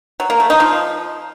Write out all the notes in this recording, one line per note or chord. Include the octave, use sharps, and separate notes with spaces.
F#3
A#3
A3
D#4
F3